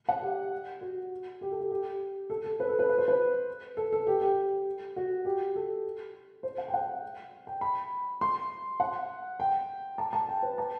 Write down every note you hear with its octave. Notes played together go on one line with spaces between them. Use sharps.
F#5
G4
F#4
G4
A4
G4
G4
A4
A4
B4
A4
B4
B4
C5
B4
A4
A4
G4
G4
F#4
G4
A4
C5
F#5
G5
F#5
G5
B5
C6
F#5
G5
A5
A5
G5
B4
A5